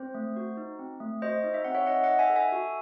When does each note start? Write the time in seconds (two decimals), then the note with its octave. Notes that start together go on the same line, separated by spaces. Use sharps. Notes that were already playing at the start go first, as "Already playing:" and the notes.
Already playing: C4 C5
0.15 A3
0.36 F#4
0.57 D#4
0.79 C4
1.00 A3
1.22 F#4 C5 D#5
1.44 D#4
1.54 E5
1.64 C4 F#5
1.75 C#5 E5
1.86 D#4 D#5 F#5
2.04 D#5 F#5
2.09 D#4
2.19 E5 G#5
2.30 A4
2.36 E5 G#5
2.52 F#4